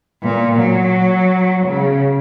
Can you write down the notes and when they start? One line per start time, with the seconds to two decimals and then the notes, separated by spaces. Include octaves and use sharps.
0.23 A#2
0.58 F#3
1.66 C#3